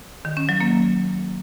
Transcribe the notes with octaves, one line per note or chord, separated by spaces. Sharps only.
D#3
C#4
F#3
A#3